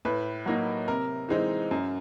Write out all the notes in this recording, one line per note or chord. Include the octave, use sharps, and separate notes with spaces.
A2 B4
F#3 A#3 D#4
C3 A#4
E3 G#3 C4 D#4
F#2